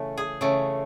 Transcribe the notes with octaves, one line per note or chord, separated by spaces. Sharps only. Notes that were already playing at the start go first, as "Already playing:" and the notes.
Already playing: C#3 E3 A3
G#4
C#3 E3 A3